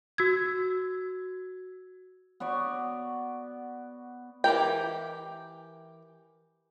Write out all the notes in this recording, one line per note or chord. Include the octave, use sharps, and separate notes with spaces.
F#4 E6 G#6
B3 F#4 D5 C#6
E3 G4 A#4 G5